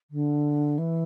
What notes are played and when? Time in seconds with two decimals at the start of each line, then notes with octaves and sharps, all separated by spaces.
0.11 D3
0.78 E3